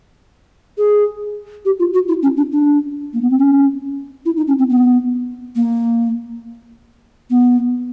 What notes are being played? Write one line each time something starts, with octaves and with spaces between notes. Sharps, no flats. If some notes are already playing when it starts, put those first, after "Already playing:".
G#4
G4
F4
F#4
E4
C#4
D4
D4
A#3
B3
C4
C#4
E4
D#4
C#4
C4
B3
A#3
B3